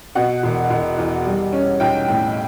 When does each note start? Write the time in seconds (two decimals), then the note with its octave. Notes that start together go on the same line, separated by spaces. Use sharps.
0.15 B2 F#5
0.43 E1
0.70 E1
0.98 E2
1.26 G3
1.53 C#4
1.80 B1 G5
2.08 A2